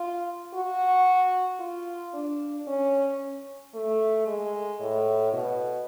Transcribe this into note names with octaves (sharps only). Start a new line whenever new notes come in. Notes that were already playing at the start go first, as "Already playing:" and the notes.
Already playing: F4
F#4
F4
D4
C#4
A3
G#3
A2
B2